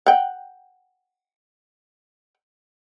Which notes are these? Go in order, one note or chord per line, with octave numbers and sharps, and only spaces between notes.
F#5 G5